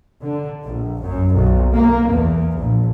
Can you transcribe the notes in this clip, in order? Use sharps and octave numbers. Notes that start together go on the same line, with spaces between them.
D3
A#1
F#2
B1
A#3
E2
A#1